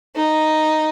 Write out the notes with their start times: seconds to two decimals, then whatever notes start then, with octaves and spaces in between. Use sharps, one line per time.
0.16 D#4